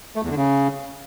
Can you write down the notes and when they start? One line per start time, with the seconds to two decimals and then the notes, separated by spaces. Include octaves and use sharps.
0.16 A3
0.23 E2
0.30 D3
0.37 C#3